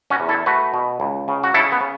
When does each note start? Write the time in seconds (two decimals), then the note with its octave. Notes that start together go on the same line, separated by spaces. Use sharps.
0.10 C#4 F#4
0.20 E2
0.29 E4 A4
0.46 A3 F#4 B4
0.74 B2
1.00 C#2
1.28 C#3
1.44 F#4
1.54 C#3 E4 A4
1.72 B3
1.81 C#3